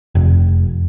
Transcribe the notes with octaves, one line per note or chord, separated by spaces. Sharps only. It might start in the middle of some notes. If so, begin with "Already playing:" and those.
F1